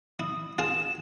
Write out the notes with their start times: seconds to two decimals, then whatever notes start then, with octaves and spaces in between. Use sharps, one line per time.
0.20 E4 D#6
0.58 F4 G#4 F5 E7